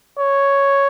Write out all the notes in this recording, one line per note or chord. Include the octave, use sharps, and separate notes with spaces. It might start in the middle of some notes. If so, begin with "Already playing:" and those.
C#5